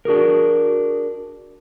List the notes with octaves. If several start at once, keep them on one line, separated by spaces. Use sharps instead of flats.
D4 F#4 G#4 A#4